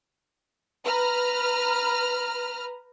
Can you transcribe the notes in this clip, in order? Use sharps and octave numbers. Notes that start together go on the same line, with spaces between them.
B4 A#5 F6